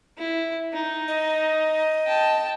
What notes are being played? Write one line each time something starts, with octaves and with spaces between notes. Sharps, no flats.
E4
D#4
D#5
G5 A5